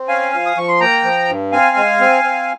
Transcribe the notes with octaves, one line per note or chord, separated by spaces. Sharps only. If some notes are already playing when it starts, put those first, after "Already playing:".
Already playing: C4
C#4 F5 G#5
F3
D#6
F3 C#6
C6
A#3 G5 A#5
F3
G2
C4 F5 G#5
G#3
C4
C4